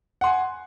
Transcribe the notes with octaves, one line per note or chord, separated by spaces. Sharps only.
F#5 G#5 C6